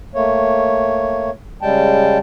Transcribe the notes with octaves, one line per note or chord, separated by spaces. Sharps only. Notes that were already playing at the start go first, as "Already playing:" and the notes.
A3 A#3 C#5
C#3 G3 G#3 G5 A5